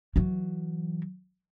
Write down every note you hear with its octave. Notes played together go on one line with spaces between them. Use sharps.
E3 F#3